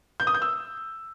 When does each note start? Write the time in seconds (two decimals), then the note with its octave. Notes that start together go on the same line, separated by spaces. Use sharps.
0.20 G6
0.27 D#6
0.34 G6
0.42 E6